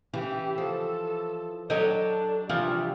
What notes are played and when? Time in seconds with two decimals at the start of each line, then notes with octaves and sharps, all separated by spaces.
0.14 C#3 E3 G4
0.58 F3 A4
1.70 F#3 D4 G4 A4 C#5 D#5
2.49 C3 E3 F3 G3 D4 F4